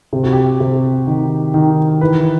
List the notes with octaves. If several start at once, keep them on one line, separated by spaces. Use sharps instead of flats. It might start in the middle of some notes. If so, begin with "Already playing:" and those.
C3 G4
F#4
G4
C3
D#3
D#3
E3 B4